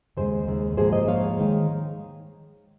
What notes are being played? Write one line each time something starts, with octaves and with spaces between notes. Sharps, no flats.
D#2 C#3 G#3 G#4 C5
D#2 C#3 G#3
G#2 F3 A#3 G#4 C5
C5 D#5
G#2 F3 A#3 C#5 F5
D#3 G#3